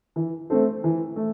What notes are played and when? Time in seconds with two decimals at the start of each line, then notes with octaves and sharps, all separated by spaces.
0.16 E3
0.50 A3 C4 A4 C5
0.84 E3
1.16 A3